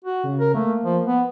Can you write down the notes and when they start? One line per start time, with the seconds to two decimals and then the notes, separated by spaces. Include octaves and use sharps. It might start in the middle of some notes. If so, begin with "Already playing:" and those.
0.05 F#4
0.23 C#3
0.40 A#4
0.55 A3 A#3
0.84 F3
1.06 B3